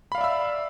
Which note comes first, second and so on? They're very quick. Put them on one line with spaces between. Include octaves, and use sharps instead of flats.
B5 F5 D5 E5 E6